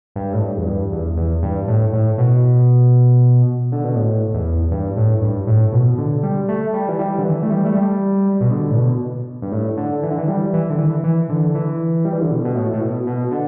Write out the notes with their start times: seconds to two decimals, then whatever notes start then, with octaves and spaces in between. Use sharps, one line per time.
0.16 G2
0.33 A2
0.41 G2
0.57 E2
0.66 G2
0.92 E2
1.17 E2
1.43 G2
1.68 A2
1.93 A2
2.18 B2
3.72 D3
3.84 B2
3.95 A2
4.34 E2
4.71 G2
4.96 A2
5.22 G2
5.47 A2
5.72 B2
5.98 D3
6.23 G3
6.48 A3
6.74 G3
6.88 E3
6.99 G3
7.18 D3
7.25 E3
7.43 A3
7.50 G3
7.65 A3
7.75 G3
8.41 B2
8.51 D3
8.71 A2
8.76 B2
9.42 G2
9.52 A2
9.77 D3
10.03 E3
10.11 D3
10.18 E3
10.28 G3
10.53 E3
10.70 D3
10.79 E3
11.04 E3
11.29 D3
11.55 E3
12.05 G3
12.13 E3
12.21 D3
12.31 B2
12.45 B2
12.55 A2
12.73 A2
12.81 B2
13.07 B2
13.31 D3